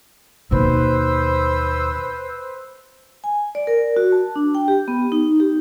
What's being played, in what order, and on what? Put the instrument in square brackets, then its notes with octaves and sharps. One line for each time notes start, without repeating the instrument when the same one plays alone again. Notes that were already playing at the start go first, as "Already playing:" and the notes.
[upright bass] D#2 B2 [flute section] B4 C5 E6
[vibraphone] G#5
D5
A#4
F#4
A5
D4
G5
G4
B3
D#4
G4